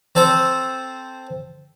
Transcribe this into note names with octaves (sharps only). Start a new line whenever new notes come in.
C4 A4 C5